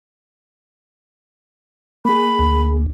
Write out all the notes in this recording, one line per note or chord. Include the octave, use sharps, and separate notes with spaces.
A#3 G#4 B5
D2